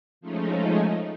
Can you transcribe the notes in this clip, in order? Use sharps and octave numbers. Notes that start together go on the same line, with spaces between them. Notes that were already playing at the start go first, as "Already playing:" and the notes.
F3 G#3 A3 C#4 D#4